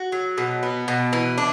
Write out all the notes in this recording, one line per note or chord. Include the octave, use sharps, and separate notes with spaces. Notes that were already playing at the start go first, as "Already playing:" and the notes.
Already playing: F#4
F#3
B2
B3
B2
E3
D4